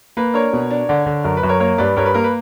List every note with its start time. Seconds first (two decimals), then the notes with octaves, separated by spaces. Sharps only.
0.17 A#3 B4
0.34 D4 A#4 C#5
0.53 B2
0.71 D4
0.89 D3
1.06 D3
1.24 F#2 A#4
1.37 B4
1.43 F#2
1.49 A#4 C#5
1.60 A#3 A#4 C#5
1.78 G2 B4 D5
1.96 G2 A#4 C#5
2.06 B4
2.14 A#3 A#4
2.24 B4